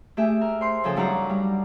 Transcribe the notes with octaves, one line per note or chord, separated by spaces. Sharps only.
A3 G4 G#4 E5
A#4
C5 C6
C#3 F3 F4 G#4 A4 G5
G2 F#3 D#4 F#5 A#5 D6
G3